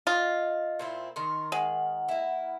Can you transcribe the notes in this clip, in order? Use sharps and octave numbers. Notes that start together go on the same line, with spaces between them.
F4 D#5
A#2 C4 E4
D#3 A#4 C6
G#3 F#5
A#3 E4